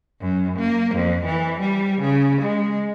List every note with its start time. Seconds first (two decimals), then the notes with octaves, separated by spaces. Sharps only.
0.21 F#2
0.58 A#3
0.95 F2
1.25 E3
1.60 G3
2.01 C#3
2.41 G#3